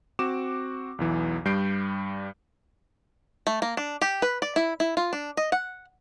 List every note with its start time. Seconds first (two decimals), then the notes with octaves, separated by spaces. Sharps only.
0.19 C4 F#4 D6 E7
0.98 B1 E2 E3
1.45 G2 G3 G6 C7 D7
3.47 A3
3.62 A#3
3.77 D4
4.02 G4
4.22 B4
4.42 D5
4.56 E4
4.80 E4
4.97 F4
5.13 D4
5.37 D#5
5.52 F#5